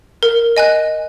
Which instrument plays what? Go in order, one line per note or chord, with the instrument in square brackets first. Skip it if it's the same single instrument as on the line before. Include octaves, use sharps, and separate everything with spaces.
[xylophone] A#4
D#5 G#5 F#6